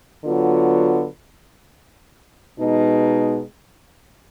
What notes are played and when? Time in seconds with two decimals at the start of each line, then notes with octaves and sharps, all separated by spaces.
0.25 D3 F#3 B3 F4
2.60 B2 G#3 D#4